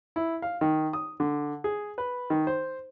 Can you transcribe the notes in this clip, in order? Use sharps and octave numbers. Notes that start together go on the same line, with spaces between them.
E4
F5
D#3
D#6
D3
G#4
B4
D#3
C5